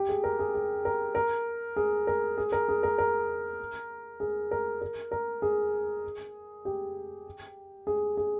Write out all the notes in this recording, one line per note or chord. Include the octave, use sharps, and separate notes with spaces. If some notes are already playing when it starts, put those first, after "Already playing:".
Already playing: G4
G#4
A#4
G#4
G#4
A#4
A#4
G#4
A#4
G#4
A#4
G#4
A#4
A#4
G#4
A#4
A#4
A#4
G#4
G4
G#4
G#4